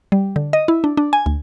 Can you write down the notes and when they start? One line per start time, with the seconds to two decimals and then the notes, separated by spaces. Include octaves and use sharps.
0.12 G3
0.36 D3
0.53 D#5
0.68 E4
0.84 D4
0.97 D4
1.13 G#5
1.26 D2